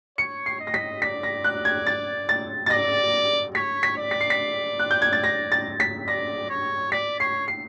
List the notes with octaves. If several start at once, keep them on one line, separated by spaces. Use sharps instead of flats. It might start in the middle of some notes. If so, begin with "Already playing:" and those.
C#5 C#7
C7
D#5
A#6
B6
D5 B6
A#6
F#6
G#6
A6
A6
A6
D5 A#6
C#5 B6
B6
D5
B6
C7
B6
F#6
G6
G#6
A6
A#6
A6
B6
D5 A#6
C#5
D5 B6
C#5 C7
C7